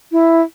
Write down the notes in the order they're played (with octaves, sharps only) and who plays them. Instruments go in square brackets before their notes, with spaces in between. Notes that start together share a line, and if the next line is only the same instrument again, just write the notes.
[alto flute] E4